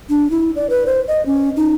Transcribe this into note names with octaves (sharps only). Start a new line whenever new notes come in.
D4
E4
D5
B4
C5
D#5
C#4
D#4